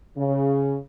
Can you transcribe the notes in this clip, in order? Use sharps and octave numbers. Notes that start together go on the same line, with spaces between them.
C#3